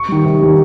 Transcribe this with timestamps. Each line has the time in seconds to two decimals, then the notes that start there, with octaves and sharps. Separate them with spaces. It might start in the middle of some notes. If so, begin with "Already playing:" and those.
Already playing: C#6
0.09 D#3 G3
0.25 C3
0.42 D#3 G3